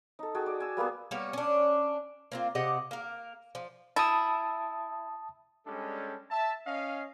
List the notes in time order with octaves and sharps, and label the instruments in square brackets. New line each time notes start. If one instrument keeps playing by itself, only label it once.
[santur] D#4 A4
F#4 G#4 G5 A5
D5
G#5 E6
G3 A#3 B3 G#4
[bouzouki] G3 A#3 B3 C#5
C#4 D4
A#3 C4 F4
C3 G4 D#5 F#5
A#3 A#4
F3
[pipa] E4 [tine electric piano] A5 D#6
[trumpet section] G3 G#3 C#4 D4 G4 A4
E5 A5
C#4 D#5 F5